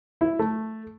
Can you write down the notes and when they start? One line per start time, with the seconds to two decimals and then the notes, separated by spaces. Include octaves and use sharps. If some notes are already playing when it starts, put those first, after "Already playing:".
0.21 E4
0.39 A3